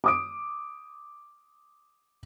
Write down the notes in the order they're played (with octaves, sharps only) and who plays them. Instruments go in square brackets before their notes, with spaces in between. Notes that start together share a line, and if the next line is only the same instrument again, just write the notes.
[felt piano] D6 D#6 D7